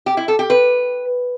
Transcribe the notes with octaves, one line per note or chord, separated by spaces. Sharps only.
G4
E4
A4
G4
B4